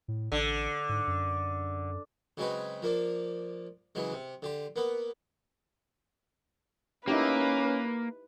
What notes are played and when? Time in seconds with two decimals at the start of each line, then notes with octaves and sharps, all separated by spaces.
0.08 A2
0.32 A1 D3
0.89 G#2
1.07 F#2
2.37 C#3 F#3 G#3 C4 F#4 B4
2.82 F3 A#3 D4
3.95 C#3 E3 F#3 G#3
4.13 C3
4.43 D3 G4 C6
4.76 A#3 B3 F#5
7.08 A#3 C#4 D#4 E4 G4 B4